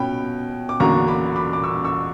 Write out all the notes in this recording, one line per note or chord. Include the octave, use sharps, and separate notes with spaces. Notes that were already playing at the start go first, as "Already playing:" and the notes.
Already playing: B2 C#4 G5 B5
D6
E2 D3 F#3 A#3 A#5 C#6
B5 D6
B5 D6
D6
C#6 E6
C#6 E6